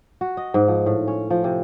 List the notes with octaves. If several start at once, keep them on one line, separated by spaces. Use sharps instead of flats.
F#4
D#5
G#2
F3
A2
C#4
F3
C3